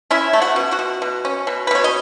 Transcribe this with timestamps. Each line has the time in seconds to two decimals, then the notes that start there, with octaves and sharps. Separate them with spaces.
0.11 C#4 E4 E5
0.33 A3
0.41 F#4 F#5
0.56 B2
0.71 F#4 F#5
0.79 B2
1.02 B2
1.25 C#4
1.47 B2
1.67 B4
1.71 B2 C#5
1.84 D#5